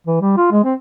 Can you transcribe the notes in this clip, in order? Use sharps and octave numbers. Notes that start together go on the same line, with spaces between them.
E3
G3
F4
G#3
C4